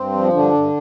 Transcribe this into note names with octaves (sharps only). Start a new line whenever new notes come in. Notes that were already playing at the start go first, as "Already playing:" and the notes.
Already playing: G2 C4
F3
G2 D3 D4
G2